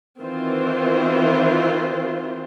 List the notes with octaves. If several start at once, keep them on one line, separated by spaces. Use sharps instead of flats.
D#3 E3 C4 F4 F#4 C5